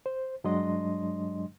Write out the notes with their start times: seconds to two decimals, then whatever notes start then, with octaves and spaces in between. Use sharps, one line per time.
0.06 C5
0.44 G2 F#3 G#3 D4 D#5 C6